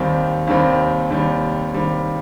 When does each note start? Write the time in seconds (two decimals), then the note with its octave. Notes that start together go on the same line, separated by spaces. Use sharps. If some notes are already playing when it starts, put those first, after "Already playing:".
Already playing: D#2 D#3 G3 C4
0.47 D#2 D#3 G3 C4
1.10 D#2 D#3 G3 C4
1.74 D#2 D#3 G3 C4